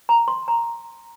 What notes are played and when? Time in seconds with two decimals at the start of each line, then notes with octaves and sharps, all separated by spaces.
0.09 A#5
0.28 C6
0.48 A#5